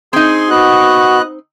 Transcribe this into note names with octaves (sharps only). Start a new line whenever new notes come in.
C4 D#4 G#4 G#5 C6
B3 F#4 D#5 F#6